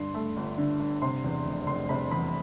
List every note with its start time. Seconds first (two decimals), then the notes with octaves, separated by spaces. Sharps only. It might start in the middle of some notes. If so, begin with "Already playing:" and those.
Already playing: G2 D3 C6
0.14 A3
0.37 G1
0.58 D3
0.80 G2
1.02 C3 C6
1.24 E2
1.45 F1
1.67 F1 C6
1.89 C3 B5
2.11 E2 B5